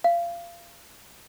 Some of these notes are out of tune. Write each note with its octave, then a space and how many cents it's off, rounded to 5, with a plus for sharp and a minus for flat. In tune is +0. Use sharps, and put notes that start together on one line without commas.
F5 -25